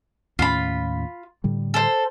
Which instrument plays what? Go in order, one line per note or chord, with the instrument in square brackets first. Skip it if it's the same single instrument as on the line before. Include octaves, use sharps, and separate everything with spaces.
[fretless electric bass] D#2 A2 C#4 [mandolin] F4 B5
[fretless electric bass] A2 D3 G3
[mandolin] A4 C5